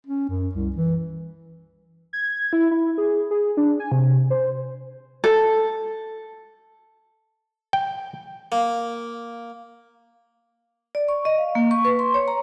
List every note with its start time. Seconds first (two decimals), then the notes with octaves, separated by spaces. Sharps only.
0.06 C#4
0.29 F#2
0.55 C2
0.76 E3
2.13 G#6
2.53 E4
2.71 E4
2.98 G#4
3.31 G#4
3.57 D4
3.80 G#5
3.92 C3
4.30 C5
5.24 A4
7.73 G5
8.52 A#3
10.95 D5
11.08 C#6
11.25 D#5
11.38 F5
11.55 A#3
11.71 C#6
11.85 B4
11.99 C6
12.14 C#5
12.28 A#5